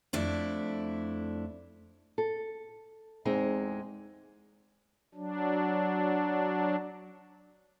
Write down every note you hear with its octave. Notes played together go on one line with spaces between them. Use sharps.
F2 A3 D4 E4
A4
E2 G#3 C4 D#4
F#3 D4